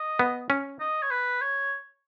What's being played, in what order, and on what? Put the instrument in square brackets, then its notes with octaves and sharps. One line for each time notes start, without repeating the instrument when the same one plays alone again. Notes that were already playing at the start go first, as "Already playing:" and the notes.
Already playing: [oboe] D#5
[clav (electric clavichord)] B3
C#4
[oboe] D#5
C#5
B4
C#5